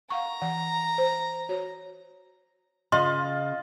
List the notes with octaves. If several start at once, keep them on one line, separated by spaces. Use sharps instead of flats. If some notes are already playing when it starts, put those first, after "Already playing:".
F5 F#5 A#5 C#6
E3 F#5
C5
F#4 C#5
C#3 F4 D#5 C6